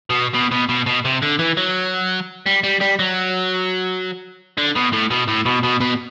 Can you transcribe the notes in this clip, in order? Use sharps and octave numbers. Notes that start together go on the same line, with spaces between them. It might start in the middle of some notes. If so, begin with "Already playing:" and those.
B2
B2
B2
B2
B2
C3
D3
E3
F#3
G3
G3
G3
F#3
D3
B2
A2
B2
A2
B2
B2
B2